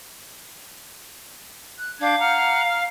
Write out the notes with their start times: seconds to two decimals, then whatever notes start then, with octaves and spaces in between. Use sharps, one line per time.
1.77 F#6
2.01 D4 F5 G6 G#6
2.19 F#5 A#5 F6
2.68 F6